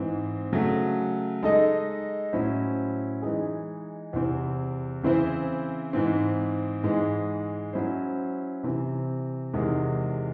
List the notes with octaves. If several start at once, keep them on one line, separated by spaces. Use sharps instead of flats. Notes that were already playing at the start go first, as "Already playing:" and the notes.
Already playing: G#2 E3 C4
C#3 F#3 A3
G#3 D#4 A4 D#5
A2 F#3 C#4 E4 C5
E3 G#3 D#4 G#4
E2 C3 E3 C4
C#3 E3 C4 E4 C5
G#2 E3 C4
G#2 E3 G#3
F#3 C#4 E4 C5
C3 E3 C4
E2 C3 D#3 G#3